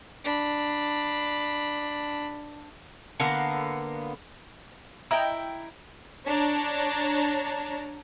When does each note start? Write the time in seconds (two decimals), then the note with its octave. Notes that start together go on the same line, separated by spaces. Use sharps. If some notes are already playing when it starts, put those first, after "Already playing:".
0.24 D4 B5
3.20 D3 A#3 B3 A#4
5.11 E4 D#5 E5 G5 A#5
6.26 D4 C#5 A5 A#5